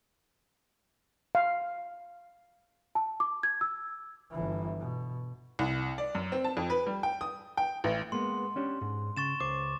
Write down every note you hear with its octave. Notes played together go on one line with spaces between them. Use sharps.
F5
A5
D6
G#6
E6
G1 E3
B2
C2
D5
F#2
C4
A5
F2
B4
G3
G5
D#6
G5
A1
G#3 A#3 B3 C6
C#4 D4 G4
G#2
C#3 C#6 A6 E7
C#2 C5 D6